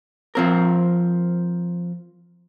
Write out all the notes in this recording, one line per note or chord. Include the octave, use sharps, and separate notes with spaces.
F3 C4 A#4